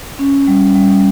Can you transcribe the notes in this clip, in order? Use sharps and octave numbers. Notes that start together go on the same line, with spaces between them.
C#4
G3
G3